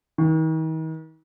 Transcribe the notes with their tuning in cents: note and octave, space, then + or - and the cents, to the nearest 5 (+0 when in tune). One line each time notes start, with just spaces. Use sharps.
D#3 +40